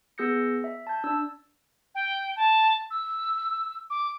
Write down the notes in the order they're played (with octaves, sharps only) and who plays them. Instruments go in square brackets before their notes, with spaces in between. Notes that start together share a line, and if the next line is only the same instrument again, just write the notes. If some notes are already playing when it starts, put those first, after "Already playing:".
[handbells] B3 G#4 E6 G6 A#6 C#7
E5
A5 G6
D4 E6
[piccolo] G5
A5
E6
D6